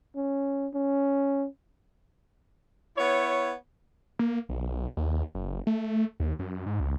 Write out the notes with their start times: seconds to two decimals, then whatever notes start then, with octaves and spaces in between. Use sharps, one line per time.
0.16 C#4
0.74 C#4
2.97 B3 E4 C#5
4.19 A#3
4.49 B1
4.97 D#2
5.35 F#1
5.67 A3
6.20 D#2
6.39 F#2
6.66 G#2
6.80 C#2